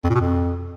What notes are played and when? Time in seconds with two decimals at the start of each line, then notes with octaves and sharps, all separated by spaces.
0.04 F2
0.10 A#2
0.15 B2
0.20 F2